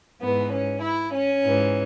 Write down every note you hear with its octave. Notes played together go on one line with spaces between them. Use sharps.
G#2 E3 B3
C#4
E4
C#4
G#2 E3